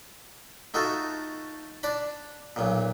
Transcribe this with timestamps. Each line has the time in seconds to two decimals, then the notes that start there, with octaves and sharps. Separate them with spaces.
0.74 A3 D#4 F4 F#4 A4
1.83 D4 D5 B5
2.56 B1 A#2